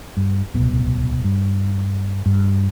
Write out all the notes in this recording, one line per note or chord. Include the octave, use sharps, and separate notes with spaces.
G2
D1 C2 B2
G2
G2